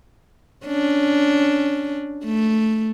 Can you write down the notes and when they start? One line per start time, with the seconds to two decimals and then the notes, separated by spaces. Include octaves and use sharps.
0.66 C#4 D4
2.25 A3